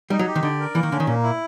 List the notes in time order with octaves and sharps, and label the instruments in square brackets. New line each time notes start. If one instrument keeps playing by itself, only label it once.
[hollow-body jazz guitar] G3 [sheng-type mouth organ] D#4
[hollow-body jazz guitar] F#3
[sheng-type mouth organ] G4
[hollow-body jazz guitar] D#3
[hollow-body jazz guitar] D3 [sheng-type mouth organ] D5
[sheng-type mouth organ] A#4
[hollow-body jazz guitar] E3 [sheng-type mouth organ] A#3
[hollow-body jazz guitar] D#3
[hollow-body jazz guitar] D3 [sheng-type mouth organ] C#4
[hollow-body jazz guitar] D#3
[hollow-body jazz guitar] A#2 [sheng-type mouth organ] A#3
[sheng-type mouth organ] E4